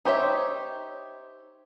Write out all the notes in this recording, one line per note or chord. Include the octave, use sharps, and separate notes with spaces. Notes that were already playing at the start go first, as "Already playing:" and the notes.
D#4 G4 C5 C#5 E5